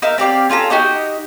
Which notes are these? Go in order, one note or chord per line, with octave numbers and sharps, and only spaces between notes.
D#4 A#4 E5 F5
C4 G4 D5 F5
C#4 F4 A4 A#5
D#4 F#4 G4 D#5